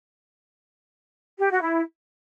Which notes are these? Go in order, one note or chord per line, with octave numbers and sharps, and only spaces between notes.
G4
F#4
E4